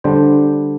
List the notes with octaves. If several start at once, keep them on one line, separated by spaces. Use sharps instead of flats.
D3 G3 D4 C5